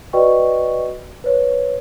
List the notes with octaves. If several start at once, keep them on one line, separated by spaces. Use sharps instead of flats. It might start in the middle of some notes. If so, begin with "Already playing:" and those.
F#4 B4 D5 D#5 G5 C#6
B4 C#5